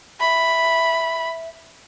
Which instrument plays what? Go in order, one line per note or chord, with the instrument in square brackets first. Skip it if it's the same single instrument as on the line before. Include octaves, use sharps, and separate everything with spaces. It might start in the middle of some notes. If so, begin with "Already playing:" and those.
[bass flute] E5 [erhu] B5